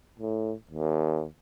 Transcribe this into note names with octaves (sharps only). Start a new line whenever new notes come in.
A2
D#2